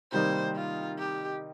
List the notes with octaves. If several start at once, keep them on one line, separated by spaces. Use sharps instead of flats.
C3 D#3 G3 A#3 D#4 C5
F4
G4